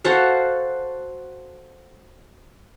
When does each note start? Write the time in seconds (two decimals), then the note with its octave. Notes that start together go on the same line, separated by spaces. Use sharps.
0.05 F#4 A4 C5 F5